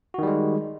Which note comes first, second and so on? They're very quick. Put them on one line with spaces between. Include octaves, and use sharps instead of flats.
F#4 D#3 G3 G#3